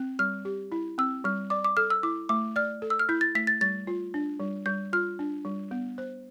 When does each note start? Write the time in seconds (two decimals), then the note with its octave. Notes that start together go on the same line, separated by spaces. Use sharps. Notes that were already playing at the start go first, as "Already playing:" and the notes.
Already playing: C4
0.19 G3 F6
0.45 G4
0.72 E4
0.98 C4 E6
1.24 G3 F6
1.50 D5 D6
1.65 D6
1.77 A4 F6
1.90 E6
2.03 E4 D6
2.29 A3 D6
2.56 D5 F6
2.82 A4
2.90 E6
2.99 F6
3.09 E4 G6
3.21 A6
3.35 A3 B6
3.47 A6
3.61 G3 A6
3.87 F4
4.14 D4
4.40 G3
4.66 G3 G6
4.93 F4 F6
5.19 D4
5.45 G3
5.71 B3
5.98 C5